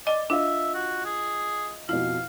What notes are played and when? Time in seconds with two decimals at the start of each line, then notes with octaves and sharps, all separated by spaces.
0.07 D5 D#5 G7
0.30 D4 F4 D#5 E5
0.74 F#4
1.05 G#4
1.89 F2 B2 E4 F5